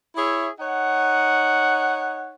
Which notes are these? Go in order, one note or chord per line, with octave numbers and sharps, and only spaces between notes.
E4 G#4 C#5 E5
D#4 C#5 F#5